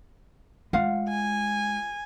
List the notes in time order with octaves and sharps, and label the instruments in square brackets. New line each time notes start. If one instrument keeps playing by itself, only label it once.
[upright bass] G#3 [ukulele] F4 F5 F#5
[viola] G#5